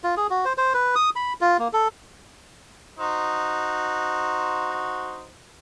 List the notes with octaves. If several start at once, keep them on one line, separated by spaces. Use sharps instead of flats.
F4
G#4
F#4
C5
C5
B4
D#6
B5
F4
A#3
A4
D#4 F#4 C5